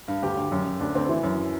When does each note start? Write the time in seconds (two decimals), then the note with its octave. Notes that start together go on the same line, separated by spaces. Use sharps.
0.08 G2
0.23 D2 G4
0.37 D2
0.52 F#2
0.65 F#2
0.80 D2 D4
0.95 D2 C4
1.09 E3 E4
1.23 F#2